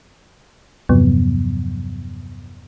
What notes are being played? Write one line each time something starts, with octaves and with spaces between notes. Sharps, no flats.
E2 G2 C3 F3 F#3 B3